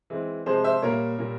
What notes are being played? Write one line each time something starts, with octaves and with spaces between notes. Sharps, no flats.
E3 G#3 C4
C3 F3 G#3 G#4 C5
C5 E5
A#2 G3 A#3 A#4 C#5
A#2 G3 A#3